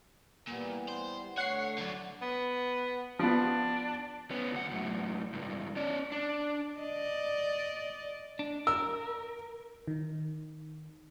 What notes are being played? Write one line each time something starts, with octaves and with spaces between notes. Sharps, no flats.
A#2 E3 G3 B3
C5
D3 A3 C#5 F#5 C#6 C7
D3 F#3 D5
B3
F3 B3 D4
B3 C#4
D2 F#5
F#2 A2
C#2 G2
C#4 D5
D4
D5 D#5
D4
A#4 E6
D#3